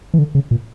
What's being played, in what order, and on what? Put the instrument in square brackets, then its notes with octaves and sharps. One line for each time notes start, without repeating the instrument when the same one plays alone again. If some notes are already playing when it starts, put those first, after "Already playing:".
[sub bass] E3
D3
C#3
A#2